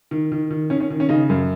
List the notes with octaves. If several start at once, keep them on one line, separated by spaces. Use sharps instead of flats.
D#3
D#3
D#3
D#3 C#4
C#4
D#3
C#4
C#3 D#4
F#2